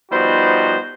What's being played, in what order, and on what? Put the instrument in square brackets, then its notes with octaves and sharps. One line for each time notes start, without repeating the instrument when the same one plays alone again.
[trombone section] F3 G3 B3 D#4 F#4 C5